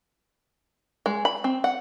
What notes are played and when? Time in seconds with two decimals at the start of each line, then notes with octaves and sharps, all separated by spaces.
1.06 G#3
1.25 B5
1.44 C4
1.64 F#5